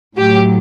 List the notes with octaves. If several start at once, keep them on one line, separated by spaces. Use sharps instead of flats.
A2 F#3 G4